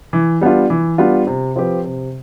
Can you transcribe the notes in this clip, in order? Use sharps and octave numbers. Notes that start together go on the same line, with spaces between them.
E3
G3 B3 D4 F4
E3
G3 B3 D4 F4
C3
F3 C4 G4 B4
C3